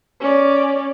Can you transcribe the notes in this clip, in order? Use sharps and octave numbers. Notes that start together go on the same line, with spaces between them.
C#4 D5